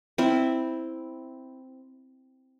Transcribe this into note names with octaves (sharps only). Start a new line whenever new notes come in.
C4 E4